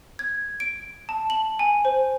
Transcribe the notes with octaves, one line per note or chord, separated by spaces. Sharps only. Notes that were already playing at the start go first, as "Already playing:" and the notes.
G#6
D7
A5
F#7
G#5
C5